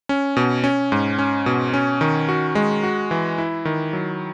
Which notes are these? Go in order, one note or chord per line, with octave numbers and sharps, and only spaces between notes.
C#4
B2
C#4
G#2
C#4
B2
C#4
D#3
F#4
G#3
F#4
E3
E4
D#3
F#3